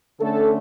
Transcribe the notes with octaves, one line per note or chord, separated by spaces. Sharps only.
D3 A3 C#4 A4